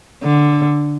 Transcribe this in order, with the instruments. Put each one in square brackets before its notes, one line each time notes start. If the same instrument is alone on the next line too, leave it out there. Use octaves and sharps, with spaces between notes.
[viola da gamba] D3